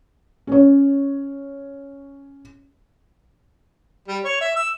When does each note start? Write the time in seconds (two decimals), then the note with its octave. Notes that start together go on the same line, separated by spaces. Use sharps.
0.47 C#4 C#5
4.08 G3
4.25 C#5
4.41 E5
4.56 E6